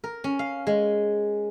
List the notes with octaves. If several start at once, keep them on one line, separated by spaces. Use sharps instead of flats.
A#4
C#4
F5
G#3